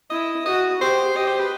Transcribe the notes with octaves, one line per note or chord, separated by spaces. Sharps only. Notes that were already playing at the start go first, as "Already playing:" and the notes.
E4 D#5
F#4 D#5
G4 C5
G4 D#5
C5
B4